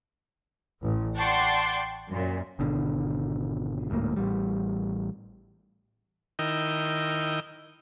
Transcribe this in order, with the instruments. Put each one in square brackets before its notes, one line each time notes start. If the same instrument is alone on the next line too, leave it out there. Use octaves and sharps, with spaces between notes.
[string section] A1
D5 F#5 G5 A5 C6 C#6
F#2 A#2
[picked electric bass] G#1 B2 D3
D1 D2 G#2 A#3
A1 G3
[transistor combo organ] D#3 E4 A#4 D#5 G5